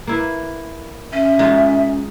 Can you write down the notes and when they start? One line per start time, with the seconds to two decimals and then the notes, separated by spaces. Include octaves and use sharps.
0.07 A#3 E4 B4
1.13 C#4 E5
1.39 G#3 D#4 F4 F#4